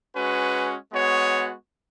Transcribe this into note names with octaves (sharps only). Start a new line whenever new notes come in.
G#3 C#4 F#4 B4
G#3 B3 F#4 C#5